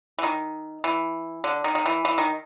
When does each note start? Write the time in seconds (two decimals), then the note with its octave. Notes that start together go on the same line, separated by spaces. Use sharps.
0.19 E3
0.23 D#3
0.84 E3
1.44 D3
1.64 D#3
1.75 D#3
1.86 E3
2.05 E3
2.18 D#3